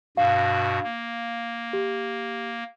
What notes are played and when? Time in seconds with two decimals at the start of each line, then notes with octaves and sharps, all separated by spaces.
0.17 G2 B2 F#4 F5
0.83 A#3
1.73 G4